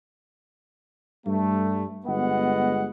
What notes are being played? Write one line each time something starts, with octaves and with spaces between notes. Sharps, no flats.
G2 G3 A3
G1 G#3 B3 D#5 F#5